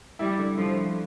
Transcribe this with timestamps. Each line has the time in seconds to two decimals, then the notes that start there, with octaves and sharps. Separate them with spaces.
0.19 G3 E4
0.39 D3
0.57 D3 F3
0.76 A3